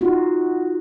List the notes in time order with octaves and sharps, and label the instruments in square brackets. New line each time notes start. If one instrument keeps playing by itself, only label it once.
[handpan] D#4 F4 F#4